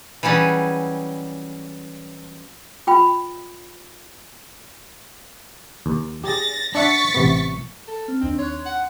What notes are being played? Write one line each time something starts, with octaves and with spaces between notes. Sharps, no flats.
E3 F#3 G3 C#4 G#4
F4 G5 B5
D#2
G4 G#4 A6 A#6
D4 E5 F#5 C#6 A6 B6
A1 C3 B3
A4
C4 F6
D#2 C4 D4 D#4
C#5 C6 F#6
F#5